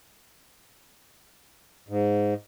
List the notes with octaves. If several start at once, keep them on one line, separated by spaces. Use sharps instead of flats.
G#2